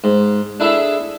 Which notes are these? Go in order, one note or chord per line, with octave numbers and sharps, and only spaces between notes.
G#2
D4 E4 G#4 A4 E5